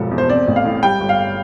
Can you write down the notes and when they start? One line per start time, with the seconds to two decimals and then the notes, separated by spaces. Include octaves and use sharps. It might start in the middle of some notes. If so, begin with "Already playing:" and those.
Already playing: E1 G2 F3 A4
0.11 E2
0.18 C5
0.29 C4 D5
0.48 A1
0.56 F5
0.65 A2
0.83 G3 G5
1.01 G1
1.09 F5